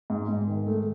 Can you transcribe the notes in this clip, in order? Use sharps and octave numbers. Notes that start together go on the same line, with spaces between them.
G#2
G#2
D#3
A3